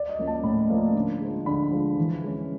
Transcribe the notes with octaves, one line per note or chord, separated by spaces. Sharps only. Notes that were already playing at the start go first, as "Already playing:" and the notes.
Already playing: D5
D#5
F3 A#3 C#4
A5
A2 B5
F3 A#3 C#4
D3
F3 G#3
D3 B5
F3 G#3
E3
G#3 C#4